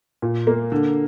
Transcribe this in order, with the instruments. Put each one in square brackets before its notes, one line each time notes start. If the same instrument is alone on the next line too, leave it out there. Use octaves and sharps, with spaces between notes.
[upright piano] A#2
A#3
D3